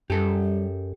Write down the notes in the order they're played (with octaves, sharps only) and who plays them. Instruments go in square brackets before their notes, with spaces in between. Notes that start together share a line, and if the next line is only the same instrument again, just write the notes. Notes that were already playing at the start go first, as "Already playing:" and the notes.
[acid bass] F#2 [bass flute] G3 [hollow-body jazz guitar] G4 A4